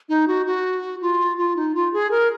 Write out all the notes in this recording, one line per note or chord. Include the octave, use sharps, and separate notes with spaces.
D#4
F#4
F#4
F4
F4
D#4
F4
G#4
A#4